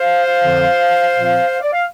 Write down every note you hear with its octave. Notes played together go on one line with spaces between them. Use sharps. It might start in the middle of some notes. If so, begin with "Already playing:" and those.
Already playing: C5 F5
F2 D3 F3 C4
A#2 F3 C4
D5
F5